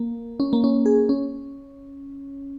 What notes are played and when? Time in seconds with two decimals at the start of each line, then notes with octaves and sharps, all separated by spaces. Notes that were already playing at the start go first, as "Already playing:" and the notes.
Already playing: A#3
0.40 C#4
0.53 A#3
0.64 C#4
0.86 G#4
1.09 C#4